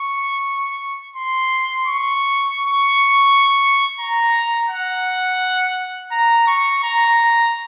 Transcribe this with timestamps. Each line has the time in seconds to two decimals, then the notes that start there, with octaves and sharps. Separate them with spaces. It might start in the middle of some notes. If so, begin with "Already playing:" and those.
Already playing: C#6
1.16 C6
1.87 C#6
2.58 C#6
4.00 A#5
4.70 F#5
6.12 A#5
6.47 C#6
6.84 A#5